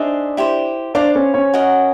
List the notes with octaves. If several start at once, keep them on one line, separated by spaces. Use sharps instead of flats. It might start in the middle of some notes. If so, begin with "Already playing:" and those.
Already playing: D4 D#4 G#4 C5 D5 E5
E4 G4 C5
D4 C5 D5 F5 A#5 D6
C#4 C#5
C#4 C#5
F#4 A#4 D#5 F#5